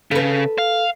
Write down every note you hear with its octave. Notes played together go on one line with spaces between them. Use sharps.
C#3 A4 B4
F5